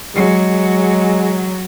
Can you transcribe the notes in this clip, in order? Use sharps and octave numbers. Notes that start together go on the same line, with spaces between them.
F#3 G#3